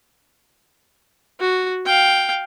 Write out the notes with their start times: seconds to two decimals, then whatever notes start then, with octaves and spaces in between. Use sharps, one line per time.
1.40 F#4
1.86 F5 G5